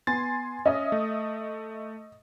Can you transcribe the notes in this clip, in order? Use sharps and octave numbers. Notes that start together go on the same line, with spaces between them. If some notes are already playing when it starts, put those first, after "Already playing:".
B3 G#5 C6 A6
C#4 D#5 E5 D#6
A3